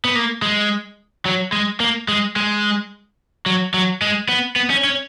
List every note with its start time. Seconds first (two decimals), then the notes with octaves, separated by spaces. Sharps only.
0.05 B3
0.15 A#3
0.42 G#3
1.25 F#3
1.52 G#3
1.80 A#3
2.08 G#3
2.36 G#3
3.46 F#3
3.74 F#3
4.02 G#3
4.28 B3
4.56 B3
4.70 C#4
4.84 C#4